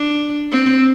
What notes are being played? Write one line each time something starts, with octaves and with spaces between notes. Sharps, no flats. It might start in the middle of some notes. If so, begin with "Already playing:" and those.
Already playing: D4
C4